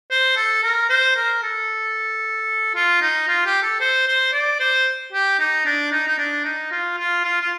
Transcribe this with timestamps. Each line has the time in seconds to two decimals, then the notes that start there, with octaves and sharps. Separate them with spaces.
0.11 C5
0.37 A4
0.63 A#4
0.90 C5
1.16 A#4
1.43 A4
2.75 F4
3.01 D#4
3.28 F4
3.46 G4
3.63 A4
3.80 C5
4.07 C5
4.33 D5
4.60 C5
5.12 G4
5.40 D#4
5.65 D4
5.92 D#4
6.08 D#4
6.18 D4
6.45 D#4
6.71 F4
6.98 F4
7.24 F4
7.41 F4